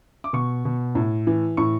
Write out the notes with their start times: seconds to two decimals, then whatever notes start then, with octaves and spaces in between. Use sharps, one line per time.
0.24 D6
0.33 B2 C#6
0.65 B2
0.95 A2
1.27 E3
1.57 A2 C#6